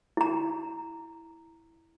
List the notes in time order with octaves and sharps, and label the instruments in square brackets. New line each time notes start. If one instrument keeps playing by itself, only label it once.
[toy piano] E4 A#5